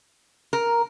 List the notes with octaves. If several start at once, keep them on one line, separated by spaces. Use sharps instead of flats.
A#4